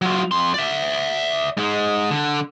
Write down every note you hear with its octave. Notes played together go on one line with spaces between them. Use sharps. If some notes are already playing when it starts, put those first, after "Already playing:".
F#3 F4
F2 C6
D5 E5
G#2 G#3
D3